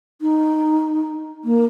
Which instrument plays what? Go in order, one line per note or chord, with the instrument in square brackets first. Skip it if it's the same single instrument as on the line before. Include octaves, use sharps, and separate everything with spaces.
[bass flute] D#4
A#3